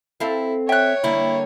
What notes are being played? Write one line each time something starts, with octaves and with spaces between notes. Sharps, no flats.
C4 E4 A4 F5
C#5 E5 G5 F#6
D3 G3 A#3 E4